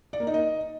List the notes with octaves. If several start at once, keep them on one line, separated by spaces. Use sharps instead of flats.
D5
A#3
D#4
D#5